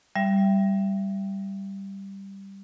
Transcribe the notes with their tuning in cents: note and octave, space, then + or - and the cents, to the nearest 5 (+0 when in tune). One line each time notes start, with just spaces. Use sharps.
G3 +0 E5 +30